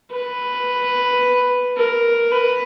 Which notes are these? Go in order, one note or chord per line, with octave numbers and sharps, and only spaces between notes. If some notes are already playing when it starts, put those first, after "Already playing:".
B4
A#4
B4